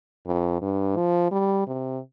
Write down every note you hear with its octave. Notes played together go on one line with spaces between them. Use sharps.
F2
G2
F3
G3
C3